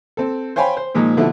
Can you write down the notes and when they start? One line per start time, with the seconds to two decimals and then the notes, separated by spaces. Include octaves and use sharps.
0.17 C4 A4
0.56 C5 C#5 F5 G5 G#5 B5
0.77 C5
0.95 A#2 F3 G#3 A#3 D#4
1.17 B2 D3 F3 A3 E4